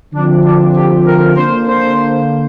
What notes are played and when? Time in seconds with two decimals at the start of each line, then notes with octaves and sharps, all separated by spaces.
0.14 D3 F3 C4 D4
0.45 D4
0.76 G4
1.06 A#4
1.36 D3 A#3 D4 C5
1.66 C5